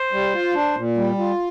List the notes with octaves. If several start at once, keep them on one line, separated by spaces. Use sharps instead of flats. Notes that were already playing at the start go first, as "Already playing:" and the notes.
Already playing: C5
G3
F4
D4
A#2
G3
F4